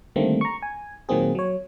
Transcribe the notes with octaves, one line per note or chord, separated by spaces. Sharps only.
D3 D#3 G3 A3 A#3 C4
A#5 C#6
G#5
A#2 D#3 F#3 A#3 C4 G#4
F#3 C#5